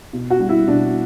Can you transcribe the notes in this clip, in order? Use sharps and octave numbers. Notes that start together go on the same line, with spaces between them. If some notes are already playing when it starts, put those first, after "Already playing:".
B2
F#4
G3
E4
B2 D4